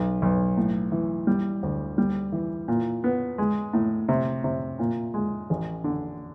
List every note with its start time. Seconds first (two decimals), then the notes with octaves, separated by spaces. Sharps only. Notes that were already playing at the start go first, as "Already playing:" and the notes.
Already playing: B1
0.22 B1
0.57 A2
0.92 E3
1.27 G3
1.63 D2
1.98 G3
2.32 E3
2.68 A#2
3.04 B3
3.38 G#3
3.73 A2
4.09 C3
4.44 C3
4.79 A#2
5.14 G#3
5.50 A1
5.84 D3